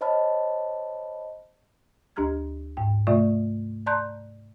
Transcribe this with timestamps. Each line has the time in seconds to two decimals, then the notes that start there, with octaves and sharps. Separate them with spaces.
0.01 C5 C#5 D#5 A5 B5 F6
2.16 D2 D4 G4 A#5 F6 G#6
2.77 G#2 G5
3.07 C3 A3 F4 D5 E5
3.86 D5 A5 A#5 C6 F#6 G6